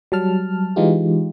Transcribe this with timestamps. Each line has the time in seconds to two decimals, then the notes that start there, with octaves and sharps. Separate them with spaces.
0.12 F#3 G3 A5 F6
0.76 E3 G#3 D#4 F4 G4